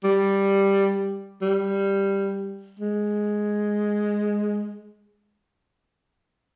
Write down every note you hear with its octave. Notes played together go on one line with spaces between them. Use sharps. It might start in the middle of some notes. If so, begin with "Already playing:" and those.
G3
G3
G#3